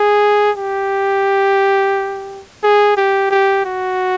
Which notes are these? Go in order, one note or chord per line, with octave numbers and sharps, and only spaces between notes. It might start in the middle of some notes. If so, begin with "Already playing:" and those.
Already playing: G#4
G4
G#4
G4
G4
F#4